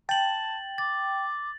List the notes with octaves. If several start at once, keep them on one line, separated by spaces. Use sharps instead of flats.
G5 A5 A6 F#7
D6 A6